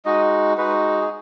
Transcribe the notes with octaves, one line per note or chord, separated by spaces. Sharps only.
G#3 D#4 F#4 D#5
G#3 D#4 F#4 B4
G#4